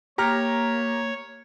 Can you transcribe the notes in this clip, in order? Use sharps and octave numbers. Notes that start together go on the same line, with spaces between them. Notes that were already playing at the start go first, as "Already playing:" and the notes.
A#3 G4 C#5 A#5 F6